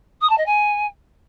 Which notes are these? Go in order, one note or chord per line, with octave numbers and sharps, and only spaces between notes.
D#6
A5
D#5
G#5